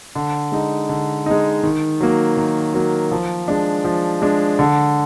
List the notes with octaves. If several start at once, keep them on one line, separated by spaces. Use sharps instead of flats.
D3
G#3 D#4
D3
G#3 D#4
D#3
F#3 A#3
D#3
F#3 A#3
F3
G#3 D4
F3
G#3 D4
D3